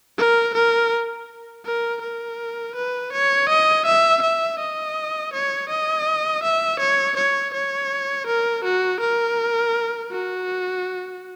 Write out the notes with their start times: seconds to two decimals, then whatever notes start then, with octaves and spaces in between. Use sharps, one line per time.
0.18 A#4
0.54 A#4
1.65 A#4
2.02 A#4
2.76 B4
3.13 C#5
3.50 D#5
3.86 E5
4.22 E5
4.59 D#5
5.34 C#5
5.70 D#5
6.43 E5
6.80 C#5
7.17 C#5
7.54 C#5
8.27 A#4
8.65 F#4
9.01 A#4
10.12 F#4